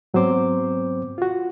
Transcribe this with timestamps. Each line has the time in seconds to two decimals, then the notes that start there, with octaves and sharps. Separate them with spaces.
0.14 G#2 F#3 B3 C4 C5 D6
1.18 F4 F#4